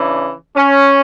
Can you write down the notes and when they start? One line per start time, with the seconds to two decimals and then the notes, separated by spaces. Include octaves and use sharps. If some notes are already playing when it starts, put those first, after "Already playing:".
Already playing: C#3 E3 D4
0.56 C#4